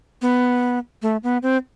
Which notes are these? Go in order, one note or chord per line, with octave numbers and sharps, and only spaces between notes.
B3
A3
B3
C4